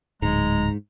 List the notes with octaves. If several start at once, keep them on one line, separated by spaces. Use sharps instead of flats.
D1 G#2 G#3 A#5